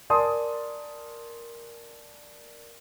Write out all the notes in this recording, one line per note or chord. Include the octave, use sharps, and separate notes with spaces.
A#4 D5 G#5 A5 C6 D#6